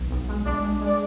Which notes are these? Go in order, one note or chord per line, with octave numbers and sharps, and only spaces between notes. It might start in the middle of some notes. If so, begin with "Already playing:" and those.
Already playing: B1
B1
G#3
B1 D4 D5
G#3
G#3
D5